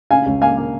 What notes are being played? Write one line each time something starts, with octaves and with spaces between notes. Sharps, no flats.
C#3 F5 G#5
C#2
A#3 F5 G#5
A#3